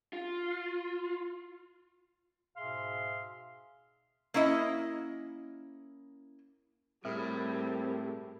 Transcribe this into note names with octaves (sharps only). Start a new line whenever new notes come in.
F4
G#2 B2 G#4 E5 F5 C6
A#3 C#4 E4 D#5
A2 G3 A3 C4 G#4 A#4